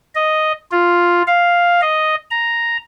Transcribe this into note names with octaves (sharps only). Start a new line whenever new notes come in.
D#5
F4
F5
D#5
A#5